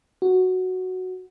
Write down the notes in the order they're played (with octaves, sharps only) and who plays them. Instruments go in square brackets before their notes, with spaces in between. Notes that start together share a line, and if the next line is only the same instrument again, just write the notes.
[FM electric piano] F#4